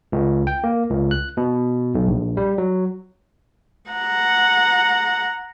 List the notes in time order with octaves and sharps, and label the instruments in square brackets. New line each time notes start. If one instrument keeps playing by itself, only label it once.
[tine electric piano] C#2
G5
A#3
C#2
F#6
B2
B1
A#1
G3
F#3
[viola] F#5 A#5